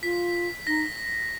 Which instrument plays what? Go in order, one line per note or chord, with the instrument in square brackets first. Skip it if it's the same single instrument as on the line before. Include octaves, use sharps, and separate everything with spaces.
[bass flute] F4 [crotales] B6
[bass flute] D#4 [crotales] A#6